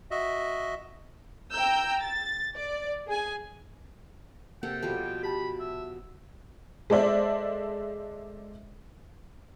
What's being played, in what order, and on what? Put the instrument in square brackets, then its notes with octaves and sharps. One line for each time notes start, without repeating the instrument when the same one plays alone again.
[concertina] F#4 D#5 E5
[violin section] G5 A#5 E6 G6
A6
D5
G#4 G#5
[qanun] C3 A4 F#5 [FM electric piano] A#3 [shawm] G5
[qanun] B2 F3 G3 [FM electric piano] A4
[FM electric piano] G4 A5 [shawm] B5
[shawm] E5
[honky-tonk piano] G#3 A4 C5 D5 E5